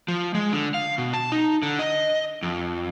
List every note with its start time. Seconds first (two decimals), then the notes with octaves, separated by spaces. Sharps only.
0.08 F3
0.34 G#3
0.53 D3
0.74 F5
0.98 B2
1.13 A5
1.32 D#4
1.63 D3
1.79 D#5
2.43 F2